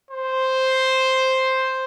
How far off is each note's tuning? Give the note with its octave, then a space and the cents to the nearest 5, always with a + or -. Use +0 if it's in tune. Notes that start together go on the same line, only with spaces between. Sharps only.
C5 +0